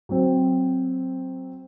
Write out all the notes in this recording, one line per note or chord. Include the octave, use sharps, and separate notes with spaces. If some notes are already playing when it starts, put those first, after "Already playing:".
F#3 C4